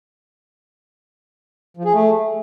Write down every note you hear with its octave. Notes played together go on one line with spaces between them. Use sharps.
F3
G#4
A3